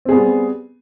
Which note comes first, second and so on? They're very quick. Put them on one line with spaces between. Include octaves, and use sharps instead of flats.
C4 G#4 B3 G3